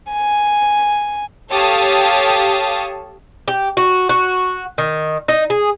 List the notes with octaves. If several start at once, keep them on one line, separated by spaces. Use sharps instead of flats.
G#5
G4 A4 C#5 F5 A5 D#6
G4
F#4
F#4
D#3
D#4
G#4